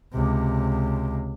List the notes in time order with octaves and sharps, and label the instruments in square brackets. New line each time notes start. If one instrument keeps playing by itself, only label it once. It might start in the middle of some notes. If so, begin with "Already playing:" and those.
[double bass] C#2 C3